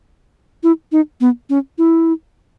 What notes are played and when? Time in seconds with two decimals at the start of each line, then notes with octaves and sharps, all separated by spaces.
0.63 E4
0.92 D#4
1.20 B3
1.50 C#4
1.78 E4